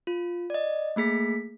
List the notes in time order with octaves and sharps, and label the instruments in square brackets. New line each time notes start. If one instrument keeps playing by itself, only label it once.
[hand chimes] F4
D5 D#5
A3 A#3 G#4 B6